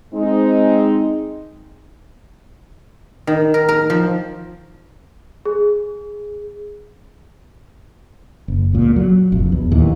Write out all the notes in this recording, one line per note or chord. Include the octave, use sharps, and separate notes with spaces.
G#3 C4 D#4
D#3
A#4
A#4
F3
G#4
F#1
C#2 A#2
F#3
F1 A#1
E2
D#2 A#2 E3